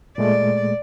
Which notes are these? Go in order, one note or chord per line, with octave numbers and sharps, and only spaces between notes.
A#2 G#3 A3 D5